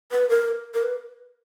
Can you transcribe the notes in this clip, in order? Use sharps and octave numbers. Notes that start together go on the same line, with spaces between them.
B4
A#4
A#4
B4